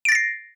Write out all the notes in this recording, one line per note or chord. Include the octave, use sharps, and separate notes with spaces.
A6 A#6 C7 D7